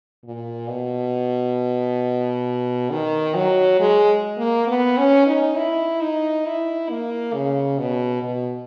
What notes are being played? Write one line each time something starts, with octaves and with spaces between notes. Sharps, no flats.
A#2
B2
D#3
F#3
G#3
A#3
B3
C#4
D#4
E4
D#4
E4
A#3
C#3
B2
B2